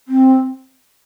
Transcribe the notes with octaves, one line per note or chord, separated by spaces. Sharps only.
C4